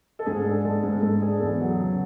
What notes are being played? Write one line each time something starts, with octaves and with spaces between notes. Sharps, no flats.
A4
G#2 G#4
D4 A4
G#3 A4
G#2 G#4
G#2 A4
D4 G#4
E2 A4
F#3
C#3